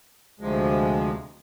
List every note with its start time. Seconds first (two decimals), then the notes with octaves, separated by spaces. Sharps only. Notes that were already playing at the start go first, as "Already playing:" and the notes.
0.40 D2 C3 F3 G#3